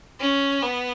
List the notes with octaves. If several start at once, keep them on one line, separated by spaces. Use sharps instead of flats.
C#4
B3